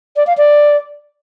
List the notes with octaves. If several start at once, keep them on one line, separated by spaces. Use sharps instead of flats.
D5
F5
D5